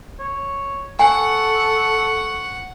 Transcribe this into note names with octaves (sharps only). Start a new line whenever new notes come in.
C#5
A4 F#5 G#5 C#6